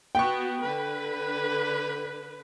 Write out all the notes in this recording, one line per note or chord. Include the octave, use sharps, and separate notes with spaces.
B3 F#4 G5 C#6
D3 B4